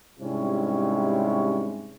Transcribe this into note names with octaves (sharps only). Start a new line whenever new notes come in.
G#2 C3 G3 C#4 E4